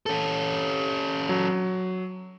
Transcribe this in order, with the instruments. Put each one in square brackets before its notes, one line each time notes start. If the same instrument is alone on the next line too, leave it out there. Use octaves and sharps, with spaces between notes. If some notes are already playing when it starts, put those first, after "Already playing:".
[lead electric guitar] C#4 A4
[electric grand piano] F#3